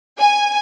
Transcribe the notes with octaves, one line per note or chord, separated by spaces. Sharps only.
G#5